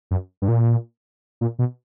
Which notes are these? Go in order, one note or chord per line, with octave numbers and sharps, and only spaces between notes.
F#2
G2
A#2
A#2
B2